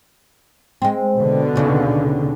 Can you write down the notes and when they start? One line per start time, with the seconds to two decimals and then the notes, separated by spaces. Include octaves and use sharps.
0.82 G#3 C4
1.17 B2 D3
1.56 D#2 C#3